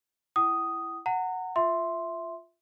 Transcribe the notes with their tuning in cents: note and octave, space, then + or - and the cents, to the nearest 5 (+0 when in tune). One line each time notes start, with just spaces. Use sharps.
E4 +15 F#5 +45 D#6 +0
F#5 +0 A#5 -30
F4 +0 E5 +0 C6 +0